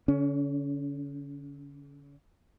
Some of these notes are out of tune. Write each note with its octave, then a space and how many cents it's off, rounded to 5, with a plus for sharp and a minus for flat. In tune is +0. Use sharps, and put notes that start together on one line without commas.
D3 -35 C#4 +25